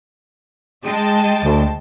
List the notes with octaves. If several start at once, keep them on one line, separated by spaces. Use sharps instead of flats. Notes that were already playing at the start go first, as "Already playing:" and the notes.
G#3 G5 A5
D2